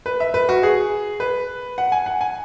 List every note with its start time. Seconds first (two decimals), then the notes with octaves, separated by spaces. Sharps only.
0.06 B4
0.20 E5
0.34 B4
0.49 F#4
0.63 G#4
1.20 B4
1.78 F#5
1.92 G#5
2.06 F#5
2.21 G#5